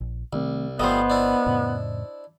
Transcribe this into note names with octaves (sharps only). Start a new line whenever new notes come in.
A#1
C2 D#3 A3 C4
G1 F3 G3 A3 B3 C5 D#5
D4 E4
F2 A2 C#3